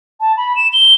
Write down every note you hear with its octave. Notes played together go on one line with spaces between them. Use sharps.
A5
B5
E7
G7